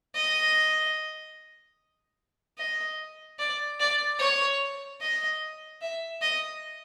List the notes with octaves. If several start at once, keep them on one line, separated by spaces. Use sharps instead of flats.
D#5
D#5
D5
D5
C#5
D#5
E5
D#5